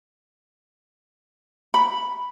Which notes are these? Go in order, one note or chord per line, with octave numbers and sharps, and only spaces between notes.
B5